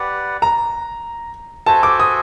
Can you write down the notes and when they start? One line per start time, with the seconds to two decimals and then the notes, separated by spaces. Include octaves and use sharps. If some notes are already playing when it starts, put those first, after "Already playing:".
Already playing: G4 B4 D5 F#5
0.42 A#5
1.66 F#4 A4 C5 E5 G#5 A5
1.83 D6
2.00 D#6